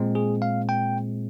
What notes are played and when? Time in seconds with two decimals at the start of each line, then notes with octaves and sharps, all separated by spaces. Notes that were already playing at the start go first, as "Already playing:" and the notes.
Already playing: A#2 G#3 C4
0.15 G#4
0.42 F5
0.69 G5